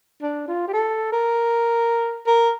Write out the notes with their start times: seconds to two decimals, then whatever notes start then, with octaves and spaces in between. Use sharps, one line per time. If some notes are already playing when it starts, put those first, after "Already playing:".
0.22 D4
0.48 F4
0.67 G4
0.73 A4
1.12 A#4
2.27 A#4